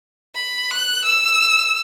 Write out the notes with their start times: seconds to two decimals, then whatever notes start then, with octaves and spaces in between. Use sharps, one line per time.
0.35 B5
0.71 F#6
1.05 E6